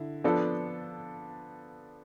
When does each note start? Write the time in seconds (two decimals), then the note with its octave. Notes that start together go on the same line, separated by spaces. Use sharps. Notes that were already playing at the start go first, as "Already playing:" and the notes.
Already playing: D3 E4
0.24 F3 B3 D4 A4